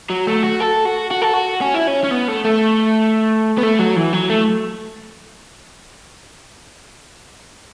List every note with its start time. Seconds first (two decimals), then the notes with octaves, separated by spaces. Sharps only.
0.10 F#3
0.27 A3
0.43 F#4
0.61 A4
0.86 F#4
1.11 F#4
1.22 A4
1.33 F#4
1.61 C#4
1.74 E4
1.87 C#4
2.04 C#4
2.11 B3
2.28 A3
2.45 A3
3.58 B3
3.63 A3
3.79 F#3
3.96 E3
4.13 F#3
4.30 A3